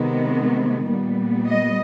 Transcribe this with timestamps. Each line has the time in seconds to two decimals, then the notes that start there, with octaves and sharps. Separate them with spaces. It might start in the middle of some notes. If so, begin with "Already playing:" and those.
Already playing: C3 D#3 G#3 B3
0.87 A#2 G3 B3
1.47 D#5